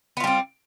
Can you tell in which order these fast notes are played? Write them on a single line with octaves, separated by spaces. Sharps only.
B3 F4 G3 C4